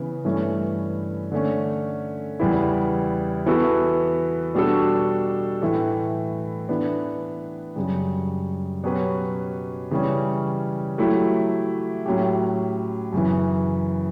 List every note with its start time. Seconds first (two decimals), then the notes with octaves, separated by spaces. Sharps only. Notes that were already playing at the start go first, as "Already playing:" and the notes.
Already playing: C#3 E3 B3
0.25 G2 E3 A3 C#4
1.32 D3 A3 C#4
2.40 E2 C#3 G3 B3 E4
3.46 E3 B3 F#4 A4
4.54 B2 G3 D4 F#4 A4
5.62 A2 E3 A3
6.69 E3 B3 D4
7.76 F#2 C#3 G3
8.84 B2 F#3 C#4 G4 B4
9.91 C#3 E3 G3 C#4
10.98 F#3 A3 E4 G4
12.06 A2 F#3 C#4 G4
13.13 F#2 C#3 E3